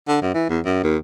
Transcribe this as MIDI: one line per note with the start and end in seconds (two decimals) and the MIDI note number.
0.08 0.18 50
0.22 0.32 42
0.35 0.49 52
0.50 0.60 40
0.65 0.80 42
0.84 0.97 39